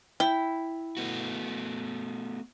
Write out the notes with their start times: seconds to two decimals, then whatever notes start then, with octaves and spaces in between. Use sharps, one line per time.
0.20 E4 G5
0.97 A3 B3 F#4